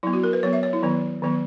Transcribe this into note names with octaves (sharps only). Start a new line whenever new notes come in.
F#3 B3 E4
F#4
A#4
B4
F#3 B3 C#5
E5
C#5
E4
D#3 F#3 B3
D#3 F#3 B3